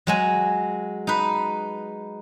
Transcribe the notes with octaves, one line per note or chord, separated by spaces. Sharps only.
F#3 G#3 G#5
D#4 B4